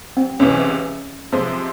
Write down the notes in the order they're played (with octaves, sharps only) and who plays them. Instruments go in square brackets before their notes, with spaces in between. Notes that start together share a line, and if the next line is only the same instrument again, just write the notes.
[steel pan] C4
[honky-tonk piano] C#2 C3 E3 [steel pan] C#4
[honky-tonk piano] C3 F3 G#3